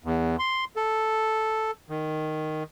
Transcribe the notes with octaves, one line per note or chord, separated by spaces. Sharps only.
E2
C6
A4
D#3